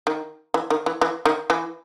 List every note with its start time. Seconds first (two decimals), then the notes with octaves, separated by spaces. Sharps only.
0.07 D#3
0.54 E3
0.70 D#3
0.86 E3
1.01 E3
1.25 D#3
1.50 E3